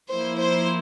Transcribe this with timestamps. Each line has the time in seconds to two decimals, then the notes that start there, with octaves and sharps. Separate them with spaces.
0.10 F3 A#3 E4 C5
0.40 C5